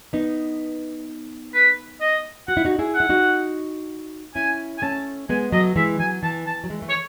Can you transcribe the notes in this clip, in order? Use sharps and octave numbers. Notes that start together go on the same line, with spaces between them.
B3 D#4
B4
D#5
F#4 F#5
E4
D#4 F#4
E4 G#4
F#5
E4
D#4 F#4
C#4 E4 G#5
G#5
A3 C#4 A5
G#3 B3 G#5
F#3 A3 D#5
E3 G#3 E5
F#3 G#5
E3 A5
A5
F#3
E3 G#3
A3
C#5